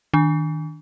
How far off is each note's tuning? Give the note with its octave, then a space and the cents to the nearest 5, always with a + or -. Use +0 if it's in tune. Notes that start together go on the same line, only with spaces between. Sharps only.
D#3 +10 D4 +0